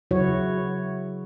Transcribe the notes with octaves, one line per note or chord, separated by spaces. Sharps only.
C#3 F#3 E4 F#4 C#5